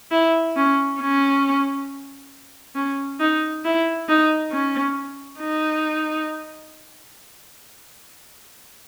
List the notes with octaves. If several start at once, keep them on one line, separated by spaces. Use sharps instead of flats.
E4
C#4
C#4
C#4
D#4
E4
D#4
C#4
D#4